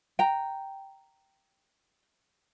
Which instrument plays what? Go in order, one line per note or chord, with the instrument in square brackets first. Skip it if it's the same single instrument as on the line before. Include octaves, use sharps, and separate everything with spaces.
[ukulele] G5 A#5